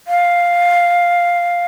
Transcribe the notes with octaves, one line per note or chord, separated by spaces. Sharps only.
F5